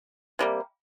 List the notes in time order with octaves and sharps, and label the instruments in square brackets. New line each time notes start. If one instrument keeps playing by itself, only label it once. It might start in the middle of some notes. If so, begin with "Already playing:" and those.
[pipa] C3 G3 A#3